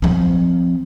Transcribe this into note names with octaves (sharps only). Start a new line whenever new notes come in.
F3 C4